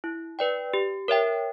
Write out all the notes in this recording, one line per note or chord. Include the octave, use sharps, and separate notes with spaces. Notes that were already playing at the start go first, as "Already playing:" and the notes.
E4
B4 D5 G5
G4
A#4 C#5 E5 G5